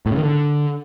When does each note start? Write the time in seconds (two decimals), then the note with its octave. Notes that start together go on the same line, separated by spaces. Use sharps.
0.06 A2
0.12 C#3
0.17 D#3
0.23 D3